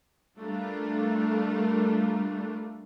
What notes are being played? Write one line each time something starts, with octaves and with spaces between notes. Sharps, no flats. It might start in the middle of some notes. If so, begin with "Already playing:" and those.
G3 A3 D4 F4 A#4